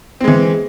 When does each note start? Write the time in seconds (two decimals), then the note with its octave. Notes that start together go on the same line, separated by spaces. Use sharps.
0.21 C4
0.24 G#3
0.28 E3